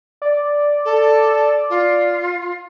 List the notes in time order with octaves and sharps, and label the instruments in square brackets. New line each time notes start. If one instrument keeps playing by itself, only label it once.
[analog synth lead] D5
[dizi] A4
F4